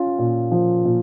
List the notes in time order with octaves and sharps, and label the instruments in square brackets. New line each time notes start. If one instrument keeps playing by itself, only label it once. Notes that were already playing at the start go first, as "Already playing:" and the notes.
Already playing: [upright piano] C#4 F4
A#2
F3
A#2